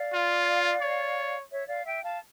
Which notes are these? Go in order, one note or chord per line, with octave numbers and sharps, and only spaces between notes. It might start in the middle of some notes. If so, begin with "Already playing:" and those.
Already playing: D5 F5
F4
C#5
C#5 E5
D5 F5
E5 G5
F5 A5